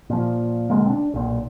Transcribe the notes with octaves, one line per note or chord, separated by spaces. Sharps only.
A#2 F3
B2 D3 G#3 A#3
C4 D4
B1 A#2